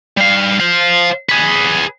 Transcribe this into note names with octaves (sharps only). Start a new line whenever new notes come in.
G3 F5
C5 F5
G#4 B4